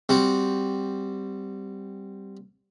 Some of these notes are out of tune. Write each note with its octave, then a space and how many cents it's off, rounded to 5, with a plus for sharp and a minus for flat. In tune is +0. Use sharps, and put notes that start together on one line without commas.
G3 +0 C4 -5 F#4 +0